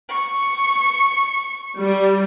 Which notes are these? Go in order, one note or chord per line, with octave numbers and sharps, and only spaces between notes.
C#6
G3